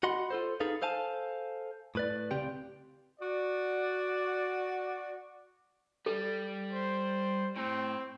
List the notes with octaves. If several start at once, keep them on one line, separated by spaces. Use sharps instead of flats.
F#4 D#5 F#5 B5 C6
F4 A4 C5
D#4 G#4 A4 B4 F5
A4 C5 F5 G#5 A5
A2 B4 D5
C#2 C#3 C4 G4 D5 G5
F#4 D5
G3 A4
C5
A2 C4